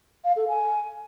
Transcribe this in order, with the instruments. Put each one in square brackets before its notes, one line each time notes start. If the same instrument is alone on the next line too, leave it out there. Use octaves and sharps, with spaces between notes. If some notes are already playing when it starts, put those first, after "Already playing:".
[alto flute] F5
A4
G#5